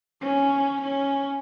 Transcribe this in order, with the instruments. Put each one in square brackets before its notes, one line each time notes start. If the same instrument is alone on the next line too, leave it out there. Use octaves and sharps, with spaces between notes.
[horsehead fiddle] C#4
C#4